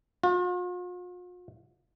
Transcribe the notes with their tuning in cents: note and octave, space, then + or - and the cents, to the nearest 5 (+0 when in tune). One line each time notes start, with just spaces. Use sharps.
F4 +45